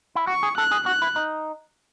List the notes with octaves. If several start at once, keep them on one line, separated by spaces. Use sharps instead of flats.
E4
F#4 C#6
G#4
A4 F#6
G#4
F#4 F#6
E4
D#4